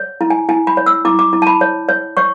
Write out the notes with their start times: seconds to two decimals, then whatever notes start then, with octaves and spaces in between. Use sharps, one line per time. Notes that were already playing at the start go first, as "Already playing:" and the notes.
Already playing: C#5
0.21 E4
0.30 G#5
0.49 E4 G#5
0.67 B5
0.77 C#5
0.86 E6
1.05 E4 D6
1.19 D6
1.33 E4
1.42 A5
1.47 B5
1.61 C#5
1.89 C#5
2.17 C#5 C#6